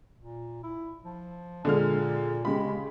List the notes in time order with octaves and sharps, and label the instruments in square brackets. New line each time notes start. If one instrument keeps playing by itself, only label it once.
[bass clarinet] A#2
E4
F3
[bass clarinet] A#2 [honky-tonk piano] D3 G#3 F6
[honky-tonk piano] C#3 G4 B5 [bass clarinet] G#3